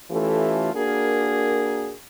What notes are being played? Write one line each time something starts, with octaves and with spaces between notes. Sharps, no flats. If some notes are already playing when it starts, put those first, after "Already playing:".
E3 A3 C#4 F4 G4 A4
A#3 D4 F#4 G#4 A#4